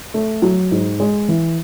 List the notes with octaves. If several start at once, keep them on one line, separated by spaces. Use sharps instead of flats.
A3
F#3
G#2
G#3
E3